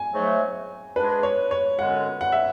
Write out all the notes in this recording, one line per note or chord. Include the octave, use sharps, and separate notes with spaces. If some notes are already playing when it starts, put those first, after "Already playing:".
Already playing: G#5
G#2 F#3 A3
G#2 G#3 D4 G#4 B4
C#5
C#5
F#2 D3 G#3 C#4 F#5
F#5
E5